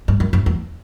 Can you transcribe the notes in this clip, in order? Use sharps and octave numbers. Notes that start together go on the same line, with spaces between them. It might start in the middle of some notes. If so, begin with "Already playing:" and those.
G2
F#2
F#2
E2